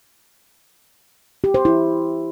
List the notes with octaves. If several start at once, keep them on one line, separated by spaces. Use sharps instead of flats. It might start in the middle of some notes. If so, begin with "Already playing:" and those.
G4
C5
E4